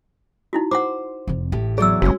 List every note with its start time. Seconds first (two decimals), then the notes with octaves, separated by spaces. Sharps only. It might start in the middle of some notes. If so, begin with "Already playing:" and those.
0.53 D#4 E4 F#4
0.71 C5 F#5 C6 D6
1.27 F1 F2
1.52 A1 A2 G4
1.78 E2 F#3 G#4 D5 E6
2.02 F#1 G#3 C#4 F#4